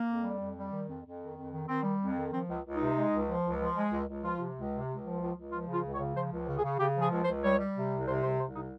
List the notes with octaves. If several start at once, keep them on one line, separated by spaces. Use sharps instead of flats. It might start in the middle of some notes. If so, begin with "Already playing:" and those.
Already playing: A#3
F2
G3
F2
G3
D#3
F2
F2
D#3
F2
D#3
D#3 C4
G3
F2
D#3
F3 C4
C#2
C#2
D#4
C3
G#3
C#2
F3
C#2
F3
G#3
C#2
C#2
F3 F4
C3
C#2
C3
C#2
F3
C#2
C#2
F3 F4
C#3
F4
C#2
C#5
C#3
F3 C5
C#2
C#3
G#4
C#3
C#3 G4
F3
G#4
C#2
C5
C#2
G3 C#5
G3
C3
C2
C3 C5
C2 C5
C2 C5
C3 D#4